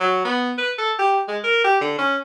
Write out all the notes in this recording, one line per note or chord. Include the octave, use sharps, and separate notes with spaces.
F#3
B3
B4
A4
G4
G#3
A#4
G4
D3
C#4